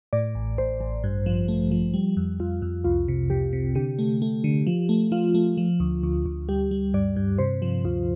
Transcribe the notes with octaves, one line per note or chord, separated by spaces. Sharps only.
A2 D5
A1
A1 C5
A1
G2
F3
A3
F3
G3
F2
F2 F4
F2
C2 F4
C3
C3 G4
C3
D3 G4
A3
A3
D3
F3
A3
F3 F4
A3
F3
D2
D2
D2
G3 G4
G3
G2 D5
G2
C3 C5
F3
D2 F4